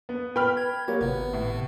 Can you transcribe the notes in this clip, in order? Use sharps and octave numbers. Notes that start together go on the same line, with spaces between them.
B3
B4 G5 B5 F6
G#6
F#3 A#3 F4 G4
G#1 C3 B3
A2